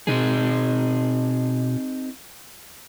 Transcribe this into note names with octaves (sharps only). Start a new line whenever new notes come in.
B2 C4 D#4 G#4